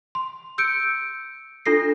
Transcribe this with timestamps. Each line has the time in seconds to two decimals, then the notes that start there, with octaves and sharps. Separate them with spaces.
0.15 C6
0.58 E6 G6 C#7 D7
1.65 D4 F4 A4 A#6 C7